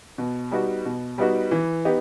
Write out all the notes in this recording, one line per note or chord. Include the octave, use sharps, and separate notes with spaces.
B2
G3 B3 D#4 F#4
B2
G3 B3 D#4 F#4
E3
B3 D#4 G4